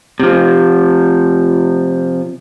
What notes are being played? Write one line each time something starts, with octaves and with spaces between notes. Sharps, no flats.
C3 F3